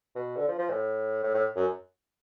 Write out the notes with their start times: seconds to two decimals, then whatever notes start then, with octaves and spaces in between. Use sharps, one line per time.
0.15 B2
0.37 D3
0.48 F3
0.58 F3
0.70 A2
1.23 A2
1.34 A2
1.56 F#2